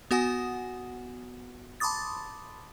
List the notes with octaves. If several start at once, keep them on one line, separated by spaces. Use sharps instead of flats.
B3 F#4 F#5 G#5 D#6
A5 B5 C6 D6 D#6 A6